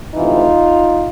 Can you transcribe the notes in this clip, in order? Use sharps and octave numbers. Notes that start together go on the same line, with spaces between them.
D2 C3 E3 D#4 F4